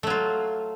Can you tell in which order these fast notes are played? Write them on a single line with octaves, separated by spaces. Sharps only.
A3 F#3 F4